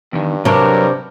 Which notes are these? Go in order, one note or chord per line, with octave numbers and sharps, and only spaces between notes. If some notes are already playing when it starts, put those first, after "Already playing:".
E2 G2 D#3
G2 C3 F#3 D4 A#4 C#5